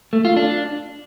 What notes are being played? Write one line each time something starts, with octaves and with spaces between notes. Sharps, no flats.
A3
F4
D4